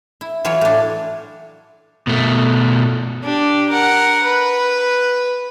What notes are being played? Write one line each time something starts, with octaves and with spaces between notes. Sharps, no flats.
E4
E3 F#3 F4 C#5
A2 D4
B2 A3
D4 G4
A#4 F#5
B4